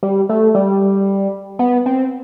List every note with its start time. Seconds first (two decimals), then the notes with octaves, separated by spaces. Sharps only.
0.03 G3
0.29 A3
0.55 G3
1.59 B3
1.86 C4